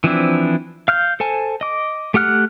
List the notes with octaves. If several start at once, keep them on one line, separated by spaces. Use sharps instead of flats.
E3 F3 C4 D4 E4
F5 F6 G6
A4 C5 G#5 A5
D#5 D6
A3 G4 F#5 F6 F#6